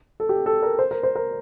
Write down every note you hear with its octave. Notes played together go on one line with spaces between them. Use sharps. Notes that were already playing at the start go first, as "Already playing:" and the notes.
A4
G4
A4
A#4
C5
A#4
C5
A#4